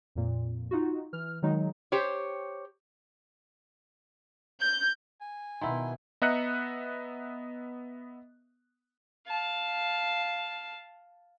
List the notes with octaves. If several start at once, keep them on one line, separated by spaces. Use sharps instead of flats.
F2 A#2
D#4 F4 F#4
E3 F6
D#3 F#3 G#3 D#4
G4 C5 C#5
G6
G#5
B2 D#3 B3 E4 F#5 A#5 C6
B3 D#5 E5 A#5 F#6 C#7
F5 A5